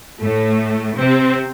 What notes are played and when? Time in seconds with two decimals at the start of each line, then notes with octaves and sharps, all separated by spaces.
0.21 A2 A3
0.98 C3 C4